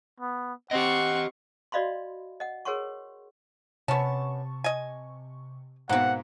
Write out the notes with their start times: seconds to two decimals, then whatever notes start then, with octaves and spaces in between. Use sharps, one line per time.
0.20 B3
0.71 C4 G4 D#5 F#5 C#6
1.72 F#4 D5 D#5 F5 B5 C6
2.40 D#5 F#5
2.65 G#4 A#4 C#5 F#5 C6 C#6
3.88 C3 B3 C#4 A5 C#6
4.64 D#5 G#5
5.89 G#2 B2 A#3 C4 F#5